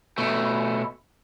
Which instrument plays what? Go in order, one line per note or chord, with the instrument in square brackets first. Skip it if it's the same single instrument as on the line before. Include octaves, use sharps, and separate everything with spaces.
[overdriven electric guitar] B2 A3